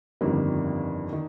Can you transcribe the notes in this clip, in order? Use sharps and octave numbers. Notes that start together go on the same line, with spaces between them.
G1 F2 D#3 G3 A#3 D4
D#3